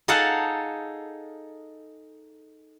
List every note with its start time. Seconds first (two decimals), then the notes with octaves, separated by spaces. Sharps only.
0.08 D#4 G#4 A4 F5 F#5 A5